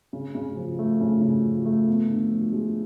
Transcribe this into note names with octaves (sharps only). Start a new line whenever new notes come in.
C#3
C#3
F3
A3
C#3
C#3
F3
A3
B3
D3
F3
G#3